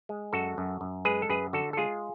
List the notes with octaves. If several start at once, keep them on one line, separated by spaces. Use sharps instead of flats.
G#3
F#2 F#4 A4
F#2
F#2
G#3 G#4 B4
A4
F#2 G#4 B4
D3 F#4 A4
A4
G#3 F4 G#4